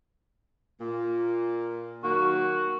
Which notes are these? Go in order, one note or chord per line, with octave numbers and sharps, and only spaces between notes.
A#2 A#3
D#3 F#3 A#3 F#4